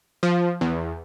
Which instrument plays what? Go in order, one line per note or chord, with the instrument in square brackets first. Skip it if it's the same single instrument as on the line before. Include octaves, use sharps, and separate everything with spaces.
[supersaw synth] F3
E2